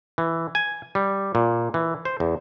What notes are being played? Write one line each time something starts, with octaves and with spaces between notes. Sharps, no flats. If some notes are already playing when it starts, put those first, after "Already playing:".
E3
G#5
G3
A#2
E3
C5
E2